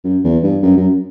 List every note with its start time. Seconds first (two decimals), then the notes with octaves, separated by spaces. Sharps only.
0.04 F#2
0.24 E2
0.43 G2
0.63 F#2
0.77 F#2